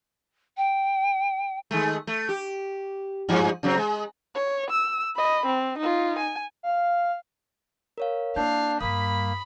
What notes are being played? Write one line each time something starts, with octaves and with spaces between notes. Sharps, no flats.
G5
D#3 G#3 A3
A3
G4
G2 F3 G#3
C#3 F#3 C4
G#3
C#5
E6
D#5 B5
C4
D#4 F4
G#5
F5
A#4 C#5 F5
A#3 D4 E4 F5 G6
G2 G3 A#3 B5 D#6 B6